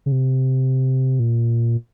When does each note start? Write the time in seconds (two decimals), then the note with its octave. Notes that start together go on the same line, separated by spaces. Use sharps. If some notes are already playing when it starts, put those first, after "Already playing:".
0.06 C#3
0.12 C3
1.20 A#2